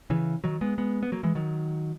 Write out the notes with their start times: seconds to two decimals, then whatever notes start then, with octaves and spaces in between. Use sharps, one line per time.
0.10 C#3 E3
0.44 D#3 F#3
0.61 G#3 B3
0.78 G#3 B3
1.03 B3
1.12 F#3 A#3
1.23 E3 G#3
1.35 D#3 F#3